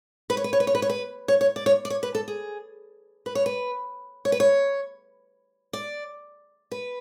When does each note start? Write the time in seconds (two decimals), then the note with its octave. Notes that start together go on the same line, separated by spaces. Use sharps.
0.30 B4
0.37 C#5
0.44 B4
0.53 C#5
0.60 B4
0.67 C#5
0.75 B4
0.82 C#5
0.90 B4
1.28 C#5
1.41 C#5
1.56 D5
1.66 C#5
1.85 D5
1.90 C#5
2.03 B4
2.15 A4
2.28 G#4
3.26 B4
3.35 C#5
3.46 B4
4.25 C#5
4.32 B4
4.40 C#5
5.73 D5
6.72 B4